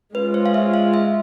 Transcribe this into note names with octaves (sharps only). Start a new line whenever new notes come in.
G#3 C#4 F4 B4
C5
F5
E5
F5
E5